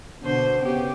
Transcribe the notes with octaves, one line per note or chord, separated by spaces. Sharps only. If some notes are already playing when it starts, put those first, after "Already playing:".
B2 D3 C5
C#3 B3 G4